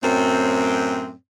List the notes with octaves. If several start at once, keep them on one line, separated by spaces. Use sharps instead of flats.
F#2 A2 C4